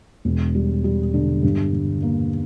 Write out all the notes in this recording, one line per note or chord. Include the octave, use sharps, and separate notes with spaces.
E1
G3
G3
D3
G2
D3
A#3